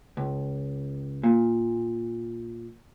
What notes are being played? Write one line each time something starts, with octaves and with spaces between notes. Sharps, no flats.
C#2
A#2